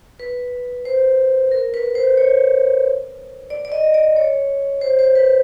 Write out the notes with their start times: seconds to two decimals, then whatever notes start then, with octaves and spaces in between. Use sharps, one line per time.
0.20 B4
0.85 C5
1.51 A#4
1.74 B4
1.95 C5
2.17 C#5
3.50 D5
3.65 D5
3.72 D#5
3.94 D5
4.16 C#5
4.81 C5
4.99 C5
5.15 B4